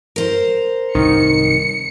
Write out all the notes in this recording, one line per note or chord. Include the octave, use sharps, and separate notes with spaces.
A#4 C5
C2 G#2 D#3 C#7